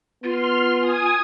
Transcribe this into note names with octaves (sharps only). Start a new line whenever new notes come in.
B3 F4 C6 F6
G#5 D#6 G#6